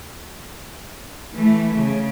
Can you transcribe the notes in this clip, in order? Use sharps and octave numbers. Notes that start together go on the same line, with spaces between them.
E3 A3
C#3